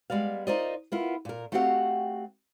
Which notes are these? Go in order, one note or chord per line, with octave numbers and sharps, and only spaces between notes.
G3 G#3 B3 D5 F5
D#4 F4 A#4 C5 D5 D#5
B3 E4 F4 A#4
A#2 A#4
A3 C4 F#4 G4 F5 F#5